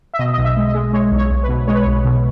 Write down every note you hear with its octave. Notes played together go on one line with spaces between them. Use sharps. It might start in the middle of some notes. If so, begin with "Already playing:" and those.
E5
B2 D#5
B1 D#5
E5
G#3
D#5
G#3
G#3 C#5
B1
C#5
B1
B4
B2
G#3 C#5
B4
B1 C#5
B2